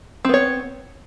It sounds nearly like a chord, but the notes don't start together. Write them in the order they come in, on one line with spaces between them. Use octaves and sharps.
C4 B3 C#5